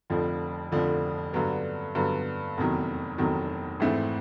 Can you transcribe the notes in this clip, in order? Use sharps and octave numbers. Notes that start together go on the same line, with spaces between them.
F1 F2 D3 F3
F1 F2 D3 F3
G2 D3 F#3 B3
G2 D3 F#3 B3
F1 E2 C3 D#3 F#3
F1 E2 C3 D#3 F#3
G#1 G#2 E3 A3 C4